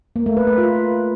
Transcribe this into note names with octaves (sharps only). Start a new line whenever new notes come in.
A#3
A3
B4
B4
F4